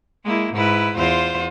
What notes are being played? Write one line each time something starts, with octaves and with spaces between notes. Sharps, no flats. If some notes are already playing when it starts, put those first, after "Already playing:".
G#3 A#3 E4
G#2 E4 B4
E2 F4 C5